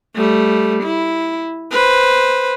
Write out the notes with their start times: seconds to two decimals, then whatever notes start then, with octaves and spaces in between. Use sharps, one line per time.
0.16 G3 A3
0.83 E4
1.71 B4 C5